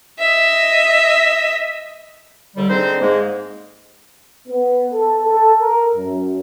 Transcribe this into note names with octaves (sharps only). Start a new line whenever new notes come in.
D#5 E5
D#2 D3 G3
D3 G#3 C4 D#4 C5
G#2 G#3 A#3
B3
A4
A4
A#4
F#2